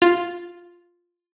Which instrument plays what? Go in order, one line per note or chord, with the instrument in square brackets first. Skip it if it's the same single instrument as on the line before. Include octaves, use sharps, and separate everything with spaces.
[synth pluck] F4